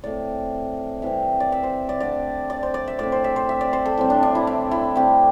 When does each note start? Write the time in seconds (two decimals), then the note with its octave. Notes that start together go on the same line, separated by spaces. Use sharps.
0.04 A2 A3 C4 D5
1.02 C3 E3 G3 C4 E5
1.40 D5
1.52 E5
1.63 C5
1.89 D5
2.00 D3 A3 C4 D5
2.50 D5
2.63 C5
2.74 D5
2.88 E5
2.99 A2 A3 C4 D5
3.12 C5
3.24 E5
3.36 C5
3.49 E5
3.61 D5
3.73 C5
3.86 A4
3.98 A2 G3 C4
4.10 D4
4.23 D4
4.35 E4
4.47 E4
4.71 E4
4.96 C3 A3 C4 G4